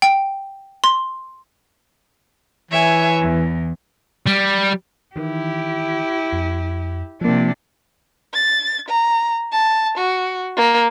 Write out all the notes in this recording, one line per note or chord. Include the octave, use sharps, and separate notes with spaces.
G5
C6
E3 C#5 E5 G#5
E2
G3
D#3 E3 E4 G4
F2
C3 F3 A#3 D4
A6
A#5
A5
F#4
A#3